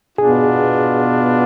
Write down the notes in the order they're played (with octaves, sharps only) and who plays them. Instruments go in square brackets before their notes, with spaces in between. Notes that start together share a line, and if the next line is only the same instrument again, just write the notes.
[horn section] B2 B3 D4 F4 [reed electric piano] G#4